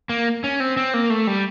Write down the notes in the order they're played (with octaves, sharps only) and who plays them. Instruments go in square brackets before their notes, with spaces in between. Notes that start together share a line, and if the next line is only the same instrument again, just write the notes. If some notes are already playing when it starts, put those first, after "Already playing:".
[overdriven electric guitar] A#3
C#4
C4
C4
A#3
A3
G3